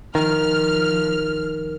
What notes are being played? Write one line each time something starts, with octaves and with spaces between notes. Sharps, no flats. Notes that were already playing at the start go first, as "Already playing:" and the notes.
D#3 F3 F6